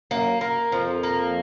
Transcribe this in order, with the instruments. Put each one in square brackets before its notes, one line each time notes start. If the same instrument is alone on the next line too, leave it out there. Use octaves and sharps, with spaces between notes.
[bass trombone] F#2 [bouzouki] A#3
[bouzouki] A#3
[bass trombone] F2 [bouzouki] F3
[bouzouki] A#3